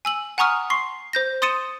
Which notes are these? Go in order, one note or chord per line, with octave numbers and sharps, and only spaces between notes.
G#5 E6 F#7
F#5 G#5 A#5 C#6 D#6 F6
C6 C#6 C7
C5 G6 A#6
C6 D#6 A6 C#7 D#7 E7